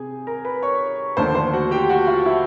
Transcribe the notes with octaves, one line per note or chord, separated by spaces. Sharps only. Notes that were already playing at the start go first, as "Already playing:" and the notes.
Already playing: C3 G4 G#4 G#5
A#4 A#5
B4 B5
C#5 C#6
D#2 D3 F3 A3 D4 C5 C6
C5 C6
F#4 F#5
G4 G5
F#4 F#5
F4 F5
E4 E5